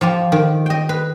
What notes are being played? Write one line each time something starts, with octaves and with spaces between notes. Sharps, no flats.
F3 F4 G4
D#3
D#5 G5
B4